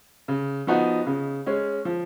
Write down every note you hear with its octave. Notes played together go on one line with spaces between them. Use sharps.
C#3
F3 B3 D#4 F#4
C#3
G#3 C#4
F3